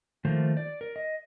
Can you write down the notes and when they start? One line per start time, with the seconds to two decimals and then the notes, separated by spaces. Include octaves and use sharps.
0.25 D#3 F3 A3 A#3 C5
0.57 D5
0.81 A#4
0.96 D#5